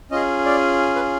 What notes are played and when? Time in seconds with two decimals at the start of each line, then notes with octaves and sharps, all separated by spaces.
0.11 C#4 F4 G#4 D#5
0.46 D5
0.96 B4